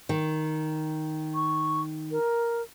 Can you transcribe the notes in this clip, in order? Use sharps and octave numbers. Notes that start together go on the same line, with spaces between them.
D#3
C#6
A#4